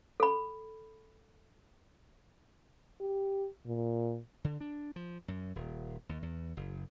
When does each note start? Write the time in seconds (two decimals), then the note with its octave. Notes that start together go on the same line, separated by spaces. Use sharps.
0.20 A4 B5
3.01 G4
3.66 A#2
4.44 D3
4.61 D4
4.96 F3
5.28 F#2
5.56 D#1
6.09 D#2
6.22 E2
6.57 F#1